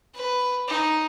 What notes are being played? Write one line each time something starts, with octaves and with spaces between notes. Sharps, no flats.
B4
D#4